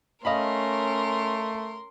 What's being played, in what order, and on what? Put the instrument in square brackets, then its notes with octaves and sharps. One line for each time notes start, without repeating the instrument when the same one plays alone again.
[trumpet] A3 [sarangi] C#4 [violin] A#4 C6 [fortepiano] D#5 F5 B5